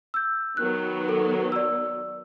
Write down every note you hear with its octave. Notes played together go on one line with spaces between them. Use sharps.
E6 G6
D#3 F#3 B3 F#6
A4
D5 E6